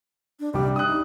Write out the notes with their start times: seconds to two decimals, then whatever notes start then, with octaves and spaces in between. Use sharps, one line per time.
0.40 D4
0.54 C2 G3 G4 D6
0.76 D4 D#6 F#6
0.88 D#4